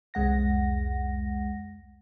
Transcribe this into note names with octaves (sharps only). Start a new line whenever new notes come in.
C2 F2 G#3 F#5 A#6